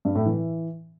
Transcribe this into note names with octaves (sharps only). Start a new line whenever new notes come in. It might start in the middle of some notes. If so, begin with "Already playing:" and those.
G2
A2
E3